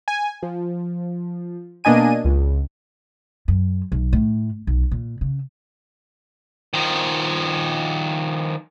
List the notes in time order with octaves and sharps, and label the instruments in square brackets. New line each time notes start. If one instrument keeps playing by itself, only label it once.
[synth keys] G#5
F3
B2 A#3 D4 D#5 G#5 D#7
C#2
[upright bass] F#2
B1
A2
B1
A#2
C#3
[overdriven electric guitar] D#3 F3